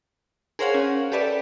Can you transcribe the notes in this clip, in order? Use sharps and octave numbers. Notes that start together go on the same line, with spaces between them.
G#4 A#4 C5 C#5 F5 F#5
C#4
G4 A4 B4 D5 E5